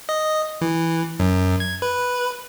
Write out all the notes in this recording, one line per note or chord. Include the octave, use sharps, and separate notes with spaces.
D#5
E3
F#2
G#6
B4